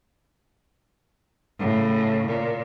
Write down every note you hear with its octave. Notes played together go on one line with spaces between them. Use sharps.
A2 C#3
A#2